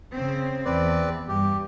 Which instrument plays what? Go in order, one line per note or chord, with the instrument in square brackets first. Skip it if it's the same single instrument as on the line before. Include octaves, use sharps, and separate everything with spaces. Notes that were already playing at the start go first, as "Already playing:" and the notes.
[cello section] C#3 C4
[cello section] E2 [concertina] C4 B4 D5
[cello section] G2 [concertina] G4